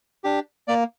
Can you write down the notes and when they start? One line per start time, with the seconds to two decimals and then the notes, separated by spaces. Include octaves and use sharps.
0.24 D4 G4
0.68 A#3 D5